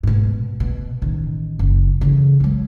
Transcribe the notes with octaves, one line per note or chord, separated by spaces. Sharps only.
G#2 B2
B2
A1 D#3
F#1
C#3 E3
F#3 G#3